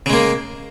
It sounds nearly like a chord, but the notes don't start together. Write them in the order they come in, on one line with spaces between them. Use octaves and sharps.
C#3 G#3 A#3